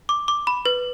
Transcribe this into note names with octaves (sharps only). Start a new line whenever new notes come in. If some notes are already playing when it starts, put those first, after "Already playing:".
D6
D6
B5
B4